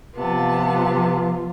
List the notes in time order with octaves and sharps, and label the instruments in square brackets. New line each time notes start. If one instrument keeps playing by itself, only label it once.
[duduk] C3 [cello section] F3 F4 [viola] B3 A5